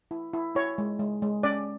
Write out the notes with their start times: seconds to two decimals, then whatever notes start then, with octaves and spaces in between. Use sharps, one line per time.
0.11 E4
0.34 E4
0.55 E4 C#5
0.78 G#3
0.99 G#3
1.22 G#3
1.43 C#4 D5